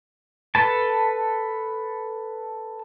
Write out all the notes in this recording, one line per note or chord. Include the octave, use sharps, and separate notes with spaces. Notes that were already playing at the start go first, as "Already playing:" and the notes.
A4 B4 A5